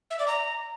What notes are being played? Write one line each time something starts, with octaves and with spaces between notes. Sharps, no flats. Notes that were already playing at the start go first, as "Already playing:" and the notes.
E5
D5
A#5